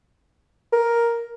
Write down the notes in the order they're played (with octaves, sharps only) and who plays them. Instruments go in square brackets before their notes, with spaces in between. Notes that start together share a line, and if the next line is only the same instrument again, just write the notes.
[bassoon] A#4